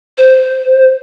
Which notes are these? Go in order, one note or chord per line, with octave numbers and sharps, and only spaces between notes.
C5